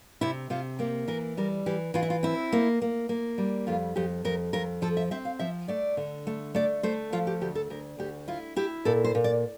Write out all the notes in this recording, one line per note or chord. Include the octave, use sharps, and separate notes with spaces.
C3 E4
C3 F4
A#3 G4
E3 A#4
G3 A#4
E3 G4
E3 F4
E4
F4
C4 E4
A#3
A#3
A#3
G3
F2 F4
F2 G4
F2 A#4
F2 A#4
F3 A4
E5
C4 E5
F5
F3 E5
A3 D5
D3
A3
A3 D5
A3 C5
F3 F4
G4
D2 G4
A4
D2 A#4
D2 G4
E4 F4
E4 G4
A#2 A4
C5
A#2
D5